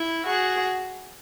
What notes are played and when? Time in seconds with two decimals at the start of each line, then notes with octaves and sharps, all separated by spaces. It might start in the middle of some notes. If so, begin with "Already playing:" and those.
Already playing: E4
0.26 F#4 G#4